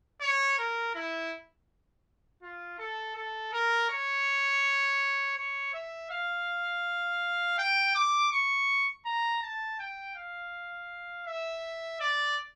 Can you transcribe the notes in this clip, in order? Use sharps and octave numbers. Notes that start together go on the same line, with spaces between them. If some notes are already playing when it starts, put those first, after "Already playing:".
C#5
A#4
E4
F4
A4
A4
A#4
C#5
C#5
E5
F5
G5
D6
C#6
A#5
A5
G5
F5
E5
D5